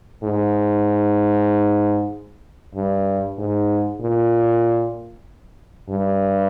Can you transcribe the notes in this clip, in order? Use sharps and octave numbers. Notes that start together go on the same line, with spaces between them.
G#2
G2
G#2
A#2
G2